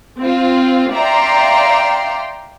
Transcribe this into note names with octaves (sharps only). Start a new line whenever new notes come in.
C4 F4
D5 E5 F5 G5 A#5 C6